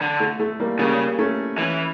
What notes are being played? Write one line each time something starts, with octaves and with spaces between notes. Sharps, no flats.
D3
A3
A3
G3 A#3
C#3 G3 A#3
A3 C#4
E3 C#4 E4